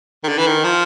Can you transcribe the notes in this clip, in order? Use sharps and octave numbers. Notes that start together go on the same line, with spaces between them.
D#3
D3
E3
D#3
F3